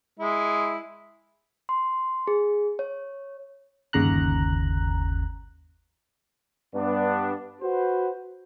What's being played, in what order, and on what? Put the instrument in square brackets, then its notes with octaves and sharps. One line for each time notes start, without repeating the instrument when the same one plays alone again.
[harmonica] G#3 E4
[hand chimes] C6
G#4
C#5
[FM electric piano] G1 D#2 C#3 A#5 F#6
[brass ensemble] G2 B3 D4
F#4 B4 C5